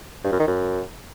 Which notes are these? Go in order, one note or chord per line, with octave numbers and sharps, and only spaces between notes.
G2
F#2
D#3
F#2